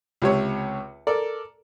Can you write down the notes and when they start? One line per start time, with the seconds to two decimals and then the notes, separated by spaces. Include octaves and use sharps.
0.22 C#2 C3 C#5
1.07 A4 A#4 D5